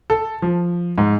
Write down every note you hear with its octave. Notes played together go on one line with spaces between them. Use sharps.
A4
F3
G#2